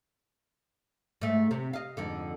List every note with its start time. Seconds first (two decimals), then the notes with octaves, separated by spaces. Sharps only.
1.21 G#2 A3
1.51 C3
1.73 D#5 F5
1.97 F2 G#2 D3